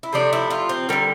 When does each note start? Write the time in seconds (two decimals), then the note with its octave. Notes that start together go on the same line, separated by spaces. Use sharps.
0.03 E4
0.13 C3 F3 A3 D4
0.33 E4
0.50 F4
0.69 C4
0.89 D3 G3 A#3 A#4